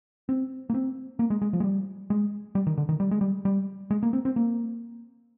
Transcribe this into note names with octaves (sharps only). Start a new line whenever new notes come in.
C4
A#3
C4
A#3
G#3
G#3
F3
G#3
G3
G#3
G3
D#3
D3
D#3
G3
G#3
G3
G3
G#3
A#3
C4
C4
A#3